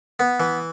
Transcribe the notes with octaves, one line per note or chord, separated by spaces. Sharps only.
B3
E3